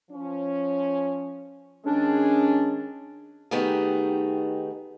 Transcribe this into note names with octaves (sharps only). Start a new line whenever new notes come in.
F3 C#4
D#3 G#3 C#4 D4 G#4
D#3 A3 B3 D#4 G4 G#4